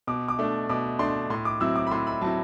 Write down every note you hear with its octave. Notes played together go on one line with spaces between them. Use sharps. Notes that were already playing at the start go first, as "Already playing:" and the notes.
B2 D6
D6
A3 D4
B2 D6
A3 D4 C6
A2 C6
D6
F#3 C4 E4 E6
D6
B5
A2 C6
B5
F#3 C4 E4 A5